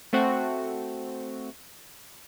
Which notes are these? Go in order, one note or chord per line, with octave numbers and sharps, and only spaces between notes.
A3 C4 F#4